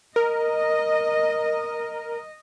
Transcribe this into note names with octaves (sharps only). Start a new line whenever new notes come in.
A#4 D#5